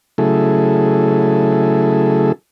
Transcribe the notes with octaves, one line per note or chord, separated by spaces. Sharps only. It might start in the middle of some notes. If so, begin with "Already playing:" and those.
C#3 F#3 A3 E4 G#4 A4